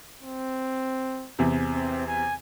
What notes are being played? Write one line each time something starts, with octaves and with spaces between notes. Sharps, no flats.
C4
E2 C3
C4
G#5